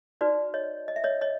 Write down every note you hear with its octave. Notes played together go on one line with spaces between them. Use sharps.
D#4 F#4 B4 D5
C#5 D#5
D#5
E5
C#5 D#5
C#5 D#5